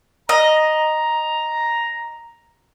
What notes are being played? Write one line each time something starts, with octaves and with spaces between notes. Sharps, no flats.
D#5 A#5